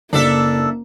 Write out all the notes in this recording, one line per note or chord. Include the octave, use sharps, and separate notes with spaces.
F#1 A#3 D4 A4 D5 E5